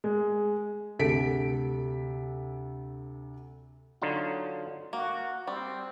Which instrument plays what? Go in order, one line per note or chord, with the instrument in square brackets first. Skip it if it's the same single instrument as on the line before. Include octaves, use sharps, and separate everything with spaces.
[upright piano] G#3
[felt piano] D2 C3 A4 B6 D7
[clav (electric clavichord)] D3 F#3 D#4 F4
[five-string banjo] A#3 [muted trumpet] F#4
[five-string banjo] G3 [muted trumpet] C4